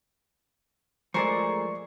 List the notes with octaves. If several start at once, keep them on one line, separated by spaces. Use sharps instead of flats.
F3 G#3 A3 G#4 A#4 C5 D5 C#6